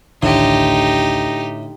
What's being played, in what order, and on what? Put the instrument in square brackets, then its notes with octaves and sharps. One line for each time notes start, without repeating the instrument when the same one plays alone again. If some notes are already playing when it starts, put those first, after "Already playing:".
[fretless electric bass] A1 D2 D#3 [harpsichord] A2 [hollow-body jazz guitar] D3 [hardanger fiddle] D#4 G4